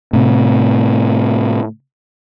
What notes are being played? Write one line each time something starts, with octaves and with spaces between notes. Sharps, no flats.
A2 C3